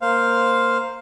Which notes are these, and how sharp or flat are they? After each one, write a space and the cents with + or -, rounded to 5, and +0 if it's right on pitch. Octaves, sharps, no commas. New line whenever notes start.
A#3 +0 C5 +0 F5 +0